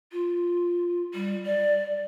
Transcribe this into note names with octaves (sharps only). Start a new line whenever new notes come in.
F4
G3
D5